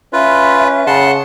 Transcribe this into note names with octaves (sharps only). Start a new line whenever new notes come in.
C#4 F4 B4 E5
C#3 F#5 A5 C6